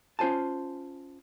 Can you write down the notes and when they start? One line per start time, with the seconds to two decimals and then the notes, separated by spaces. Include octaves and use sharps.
0.19 C#4 F4 C5 G#5 A5